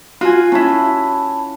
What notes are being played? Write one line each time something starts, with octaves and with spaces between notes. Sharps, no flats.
F4 F#4 G#5
C#4 E4 A5 B5